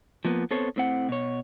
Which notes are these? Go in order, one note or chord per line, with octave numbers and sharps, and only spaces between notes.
F3 A#3 B3
B3 C4 A4 C5 C#5
A2 C4 F#5
B2 C#5